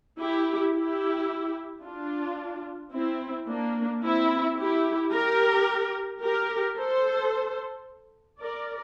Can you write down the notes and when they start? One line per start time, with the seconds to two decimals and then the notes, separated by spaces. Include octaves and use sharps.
0.19 E4 G4
0.74 E4 G4
1.83 D4 F4
2.93 C4 E4
3.48 A#3 D4
4.03 C4 E4
4.58 E4 G4
5.13 G4 A#4
6.22 G4 A#4
6.77 A4 C5
8.41 A#4 D5